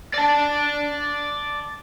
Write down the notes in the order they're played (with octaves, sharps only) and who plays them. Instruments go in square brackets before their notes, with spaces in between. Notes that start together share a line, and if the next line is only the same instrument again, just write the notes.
[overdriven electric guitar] D5 A5